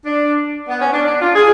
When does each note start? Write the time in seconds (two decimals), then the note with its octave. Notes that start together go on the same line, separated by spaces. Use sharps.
0.04 D4
0.67 B3
0.79 C#4
0.91 D4
1.05 D4
1.20 F4
1.34 G#4